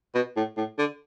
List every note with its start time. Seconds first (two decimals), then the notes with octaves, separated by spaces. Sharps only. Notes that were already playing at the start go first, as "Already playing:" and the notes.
0.14 B2
0.36 A2
0.57 A2
0.78 D3